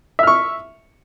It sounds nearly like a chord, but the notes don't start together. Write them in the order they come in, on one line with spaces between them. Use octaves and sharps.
E5 F6 C#6